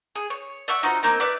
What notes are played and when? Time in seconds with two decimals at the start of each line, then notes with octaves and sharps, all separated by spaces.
0.16 G#4
0.30 C#5
0.68 D5 E5 F#5 C#6
0.83 D#4 F4 F#4 C5
1.03 A#3 C4 D#4
1.20 E4 B4 D5 D6